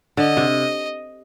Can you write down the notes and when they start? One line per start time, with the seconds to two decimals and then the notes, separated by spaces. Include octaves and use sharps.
0.17 D3 D#5
0.37 C3